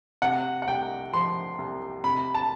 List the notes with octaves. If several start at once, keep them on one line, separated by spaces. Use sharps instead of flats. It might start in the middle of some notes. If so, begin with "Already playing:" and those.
C3 F#5
F#5
C2 G5
F3 C6
C2
C3 B5
A5